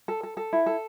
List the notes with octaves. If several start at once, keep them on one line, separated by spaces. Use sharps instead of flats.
A4
A4
A4
E4
A4